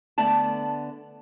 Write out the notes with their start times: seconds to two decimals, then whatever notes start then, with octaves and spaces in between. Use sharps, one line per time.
0.18 D3 A3 B3 D5 A5